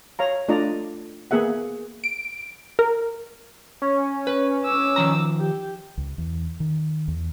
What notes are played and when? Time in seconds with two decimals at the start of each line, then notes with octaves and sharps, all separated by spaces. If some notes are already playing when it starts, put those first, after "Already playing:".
0.19 C#5 F5 A#5
0.48 A3 D4 F4 D5 D#5 A#5
1.31 A#3 B3 G#4 E5 F#5
2.04 D7
2.79 A#4
3.82 C#4
4.27 B4
4.65 D6 E6
4.96 D#3 F3 A#5
5.40 G4
5.97 C#2
6.18 E2
6.60 D#3
7.08 E2